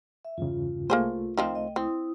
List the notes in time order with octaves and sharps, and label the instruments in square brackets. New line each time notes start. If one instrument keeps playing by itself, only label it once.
[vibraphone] E5
[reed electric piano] E2 G2 C#3 [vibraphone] F4
[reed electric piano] C2 A3 [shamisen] A#3 G#4 C5
[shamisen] D#3 F3 C4
[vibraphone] D#5 G5
[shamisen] C4 [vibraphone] E4 D#6